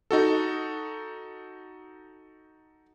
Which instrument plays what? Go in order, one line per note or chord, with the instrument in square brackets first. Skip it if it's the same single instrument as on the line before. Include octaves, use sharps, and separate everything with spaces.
[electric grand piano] D#4 F#4 A4